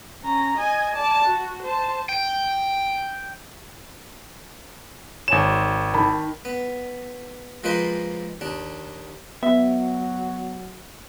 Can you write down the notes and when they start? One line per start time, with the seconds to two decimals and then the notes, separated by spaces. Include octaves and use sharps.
0.23 C#4 A#5
0.58 D#5 G#5
0.95 D5 A5
1.24 F#4
1.63 C5 A5
2.09 G5
5.28 G#1 C#5 G#5 E7
5.94 D#3 A5 B5
6.45 B3
7.64 F3 G#3 A#3 F4 B4 C5
8.41 D#2 D4
9.43 F#3 B3 E5